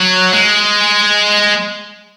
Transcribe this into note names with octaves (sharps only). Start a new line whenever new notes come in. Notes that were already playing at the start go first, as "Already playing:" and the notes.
Already playing: F#3
G#3